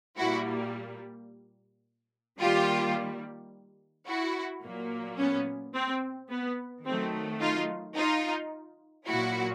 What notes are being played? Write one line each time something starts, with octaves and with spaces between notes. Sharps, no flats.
A#2 G3 A#3 E4 F#4
D#3 G3 A#3 F4 G4
E4 F#4
A#2 F#3 A#3
B3 C#4
C4
B3
D#3 F#3 A3 C4
D#4 F4
D#4 F4
A#2 F#3 A#3 E4 F#4